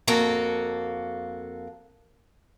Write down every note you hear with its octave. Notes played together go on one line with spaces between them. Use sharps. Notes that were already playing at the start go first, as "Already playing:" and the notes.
F2 A#3 F#4 A4